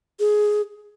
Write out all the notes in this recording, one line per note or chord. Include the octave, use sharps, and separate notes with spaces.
G#4